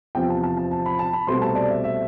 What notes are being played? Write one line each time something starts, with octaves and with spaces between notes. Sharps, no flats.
E2 C3 F3 C4 G5
A5
A5
A5
A5
B5
A5
B5
C2 B2 A3 C4 C6
A5
D5
E5
E5